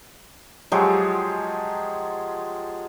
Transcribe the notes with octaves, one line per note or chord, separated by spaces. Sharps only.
F3 F#3 G#3 G4